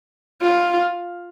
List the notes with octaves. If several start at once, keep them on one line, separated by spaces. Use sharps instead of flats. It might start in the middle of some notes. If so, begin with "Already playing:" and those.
F4